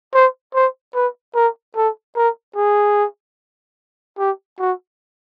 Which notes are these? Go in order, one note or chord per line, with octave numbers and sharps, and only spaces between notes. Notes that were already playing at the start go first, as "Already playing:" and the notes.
C5
C5
B4
A#4
A4
A#4
G#4
G4
F#4